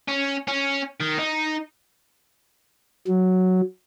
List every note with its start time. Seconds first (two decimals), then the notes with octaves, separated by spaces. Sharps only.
0.08 C#4
0.48 C#4
1.01 D#3
1.19 D#4
3.07 F#3